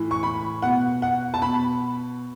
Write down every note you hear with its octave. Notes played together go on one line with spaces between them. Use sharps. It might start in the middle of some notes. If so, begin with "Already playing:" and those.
Already playing: A2 E3
C#6
B5
B2 F#5
F#5
A5
B2 B5